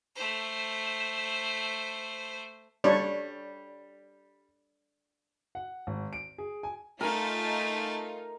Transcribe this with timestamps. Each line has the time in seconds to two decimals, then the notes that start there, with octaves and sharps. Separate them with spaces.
0.16 A3 C5
2.84 G3 D4 C#5
5.55 F#5
5.87 G#1
6.13 D7
6.38 G#4
6.63 G#5
7.01 A3 D#4 F4 A#4 G#5 A5